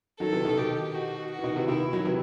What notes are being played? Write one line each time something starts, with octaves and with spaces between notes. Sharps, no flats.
D#3 F#3 A4
C3 E3
B2 D#3
B2 D#3 G4
F#4
F#4
E3
B2 D#3
C3 E3
B2 D#3 E4
D#3 F#3
C3 E3